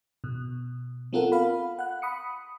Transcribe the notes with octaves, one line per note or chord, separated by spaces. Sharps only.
B2
B3 C4 F4 A4 A#4 F#5
F5 B5
F#5 F#6
B5 D#6 C#7